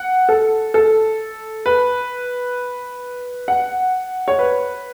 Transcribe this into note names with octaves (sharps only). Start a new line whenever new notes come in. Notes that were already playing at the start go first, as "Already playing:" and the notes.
Already playing: F#5
A4
A4
B4
F#5
C#5
B4